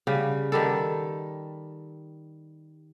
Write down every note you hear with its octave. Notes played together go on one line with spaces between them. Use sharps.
C#3 G3
D#3 G3 A4